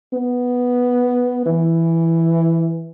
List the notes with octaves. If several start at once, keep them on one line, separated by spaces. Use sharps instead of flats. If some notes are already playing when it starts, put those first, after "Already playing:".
B3
E3